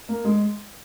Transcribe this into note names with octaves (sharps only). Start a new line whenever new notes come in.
A#3
G#3